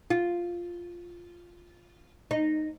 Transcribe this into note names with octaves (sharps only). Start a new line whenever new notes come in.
F4
D#4